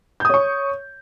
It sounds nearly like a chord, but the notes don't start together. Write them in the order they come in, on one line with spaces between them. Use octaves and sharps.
G6 D#6 C#5 C#6